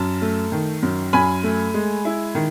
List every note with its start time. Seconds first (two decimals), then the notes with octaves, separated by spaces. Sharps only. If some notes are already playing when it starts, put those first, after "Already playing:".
Already playing: F#2 A5
0.22 A3
0.52 D#3
0.82 F#2
1.13 F#2 G#5 B5
1.43 A3
1.74 G#3
2.05 E4
2.35 D#3